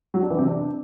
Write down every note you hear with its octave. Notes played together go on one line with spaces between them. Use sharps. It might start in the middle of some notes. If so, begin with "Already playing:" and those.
F#3
D4
E3
C3
D4